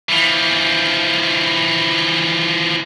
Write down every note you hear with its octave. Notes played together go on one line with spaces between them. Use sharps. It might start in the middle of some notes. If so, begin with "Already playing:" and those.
E3 F3